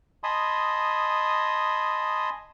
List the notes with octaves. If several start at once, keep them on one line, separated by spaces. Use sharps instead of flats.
D#5 G#5 A5 B5 C6 D#6